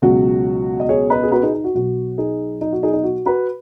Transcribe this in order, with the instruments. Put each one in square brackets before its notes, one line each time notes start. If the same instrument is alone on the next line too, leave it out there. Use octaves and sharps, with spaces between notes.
[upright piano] C#2 B2 F#3 F#4
D#5
G#4 C#5
B4 D#5
G#4
F#4 B4
D#4 G#4
D#4
F#4
B1 B2 F#3 F#4
D#4 G#4
D#4
F#4
D#4 G#4
D#4
F#4
F#4 B4